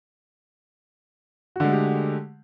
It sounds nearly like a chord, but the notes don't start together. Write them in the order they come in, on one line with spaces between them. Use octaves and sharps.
F#4 D3 G#3 A3 G4